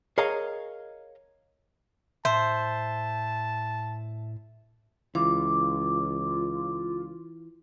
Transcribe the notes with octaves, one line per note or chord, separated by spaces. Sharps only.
G#4 A#4 C#5 D#5 F5 A#5
A2 C5 E5 A5
C#2 E3 F4 D6